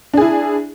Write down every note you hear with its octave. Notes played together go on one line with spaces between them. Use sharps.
D4 E4 G#4